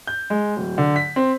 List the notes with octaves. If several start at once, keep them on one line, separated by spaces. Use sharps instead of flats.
G6
G#3
D1
D3
B6
C4